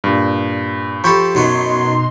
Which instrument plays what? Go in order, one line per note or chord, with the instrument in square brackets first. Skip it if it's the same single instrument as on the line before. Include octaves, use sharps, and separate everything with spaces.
[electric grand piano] G2 A#2
[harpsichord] F3 G4 A4 [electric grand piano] B5 C#6 G6
[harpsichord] F#2 F#3 B3 [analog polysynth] B2 D#4 C6